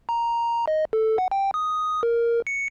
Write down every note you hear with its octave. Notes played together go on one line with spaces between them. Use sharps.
A#5
D#5
A4
F#5
G5
D#6
A#4
C#7